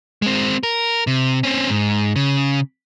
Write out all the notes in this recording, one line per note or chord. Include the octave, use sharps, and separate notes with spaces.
G#3 C4
A#4
C3
C4 C#4
G#2
C#3